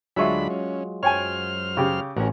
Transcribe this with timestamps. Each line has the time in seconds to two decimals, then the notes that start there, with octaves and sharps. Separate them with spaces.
0.16 D2 F#3 G#3 D4 F4 E5 B5 C#6
0.50 C#4
1.03 F#2 C5 C#5 G5 G#5 F6
1.77 C#3 G4
2.16 A1 C#4 F#4 A#4